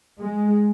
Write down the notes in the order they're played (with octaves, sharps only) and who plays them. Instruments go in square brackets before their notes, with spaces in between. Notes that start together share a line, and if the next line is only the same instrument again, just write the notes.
[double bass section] G#3